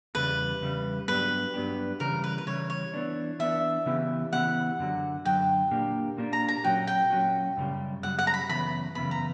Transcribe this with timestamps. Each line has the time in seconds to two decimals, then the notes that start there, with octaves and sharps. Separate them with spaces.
0.15 E2 C#3 G3 B4
0.61 E2 C#3 G3
1.08 G2 F#3 B3 D4 G4 B4
1.54 G2 F#3 B3 D4 G4
2.00 C#3 E3 G3 A#4
2.24 B4
2.38 B4
2.47 C#3 E3 G3 C#5
2.70 C#5
2.94 E3 B3 D4
3.39 E3 B3 D4 E5
3.86 C#3 E3 B3 E4 G4
4.32 C#3 E3 B3 E4 G4 F#5
4.79 F#2 D3 F#3
5.25 F#2 D3 F#3 G5
5.71 A#2 A#3 D4 G4
6.18 A#2 A#3 D4 G4
6.33 A#5
6.48 A#5
6.64 A#2 F#3 C#4 F#4 G5
6.87 G5
7.10 A#2 F#3 C#4 F#4
7.57 F#2 C#3 G3
8.03 F#2 C#3 G3 F#5
8.19 F#5
8.27 A#5
8.34 B5
8.49 F#2 C#3 E3 B3 B5
8.95 F#2 C#3 E3 B3 B5
9.11 A#5